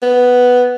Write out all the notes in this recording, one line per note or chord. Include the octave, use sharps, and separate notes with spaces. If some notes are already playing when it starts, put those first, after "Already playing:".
B3